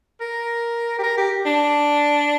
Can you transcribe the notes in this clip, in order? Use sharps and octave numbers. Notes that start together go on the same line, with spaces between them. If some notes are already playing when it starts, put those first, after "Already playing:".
A#4
G4
A#4
G4
D4